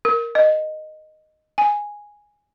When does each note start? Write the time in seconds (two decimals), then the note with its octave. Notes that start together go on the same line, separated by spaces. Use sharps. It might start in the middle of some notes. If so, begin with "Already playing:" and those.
0.05 A#4
0.35 D#5
1.58 G#5